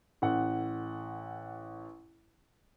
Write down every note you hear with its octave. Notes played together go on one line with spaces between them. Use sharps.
A1 F#5